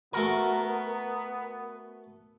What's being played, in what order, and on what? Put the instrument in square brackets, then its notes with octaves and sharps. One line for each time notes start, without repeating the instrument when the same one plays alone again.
[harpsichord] A3 F#4 G#5 [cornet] B3 [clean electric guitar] A#4